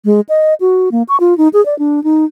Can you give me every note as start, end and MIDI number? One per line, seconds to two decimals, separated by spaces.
0.05 0.21 56
0.29 0.54 75
0.61 0.89 66
0.92 1.03 58
1.09 1.17 85
1.20 1.36 65
1.38 1.48 63
1.53 1.64 68
1.66 1.77 74
1.79 2.03 62
2.04 2.25 63